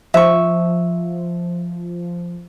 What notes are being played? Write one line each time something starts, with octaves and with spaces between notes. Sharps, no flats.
F3 E5 C#6